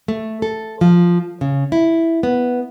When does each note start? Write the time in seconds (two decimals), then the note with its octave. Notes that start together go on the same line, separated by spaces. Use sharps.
0.08 A3
0.42 A4
0.81 F3
1.41 C#3
1.72 E4
2.23 B3